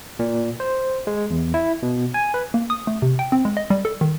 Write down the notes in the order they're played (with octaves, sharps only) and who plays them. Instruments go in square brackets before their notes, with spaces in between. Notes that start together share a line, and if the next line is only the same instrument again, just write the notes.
[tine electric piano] A#2
C5
G#3
E2
E4
B2
G#5
B4
[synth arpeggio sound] A#3
D#6
A3
C3
G5
C4
G#3
D#5
G3
A4
D#3